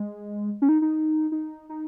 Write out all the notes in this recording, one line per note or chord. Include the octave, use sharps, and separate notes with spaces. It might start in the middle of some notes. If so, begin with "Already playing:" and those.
Already playing: G#3
C#4
D#4
D#4
D#4
D#4